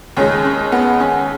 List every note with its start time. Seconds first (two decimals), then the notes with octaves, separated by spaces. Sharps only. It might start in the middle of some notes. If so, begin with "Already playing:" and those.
0.17 D#2 C#3 G#3 C#4
0.45 C#4
0.72 B3
1.00 C#4